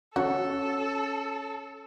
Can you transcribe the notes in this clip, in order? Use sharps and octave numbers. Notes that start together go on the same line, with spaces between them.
C#4 F#4 A4